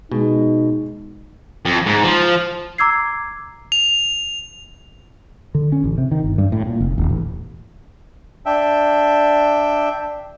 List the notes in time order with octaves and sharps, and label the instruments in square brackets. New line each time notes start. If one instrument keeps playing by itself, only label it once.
[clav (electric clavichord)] B2 [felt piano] G#3 [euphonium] D#4
[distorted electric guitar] F2
G#2
F3
[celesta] A#5 D6 E6 G#6 C7
[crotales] F7
[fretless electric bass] D3
C#4
A1
C3
D#3
G1
G2
A2
A#2
F1
D#1
A1
[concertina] D4 E5 G5